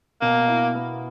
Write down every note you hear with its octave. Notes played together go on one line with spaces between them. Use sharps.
B2 A#3
E4
B3